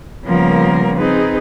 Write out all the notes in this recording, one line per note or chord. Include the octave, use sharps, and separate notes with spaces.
C#3 F3 G3 A#3 B3 A#4
C4 D#4 G#4 B4